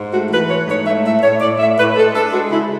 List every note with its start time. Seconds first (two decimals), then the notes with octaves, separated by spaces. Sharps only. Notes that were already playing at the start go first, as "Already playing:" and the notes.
Already playing: G#2
0.12 A3 F#4
0.30 E3 B4
0.49 A3 C#5
0.67 G#2 C#5
0.85 A3 E5
1.04 A2 E5
1.22 A2 C#5
1.40 A2 D5
1.58 A2 E5
1.77 A2 B4
1.95 G#3 A4
2.14 D4 A4
2.32 G#3 F#4
2.51 C#3 E4